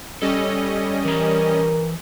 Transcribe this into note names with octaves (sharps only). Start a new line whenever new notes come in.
G3 C#4 A4 D#5
E3 A#4 A#5